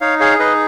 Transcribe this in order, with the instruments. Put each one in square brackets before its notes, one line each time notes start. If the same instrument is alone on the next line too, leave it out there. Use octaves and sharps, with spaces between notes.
[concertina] D#4 C#5 F5
G#4 C#5 F5
D#4 B4 D#5